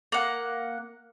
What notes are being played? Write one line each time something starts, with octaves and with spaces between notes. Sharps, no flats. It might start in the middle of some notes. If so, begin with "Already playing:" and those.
A#3 F#5